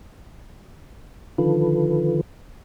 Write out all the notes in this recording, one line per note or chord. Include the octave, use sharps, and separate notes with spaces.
D3 D#3 F3 F4 A4 B4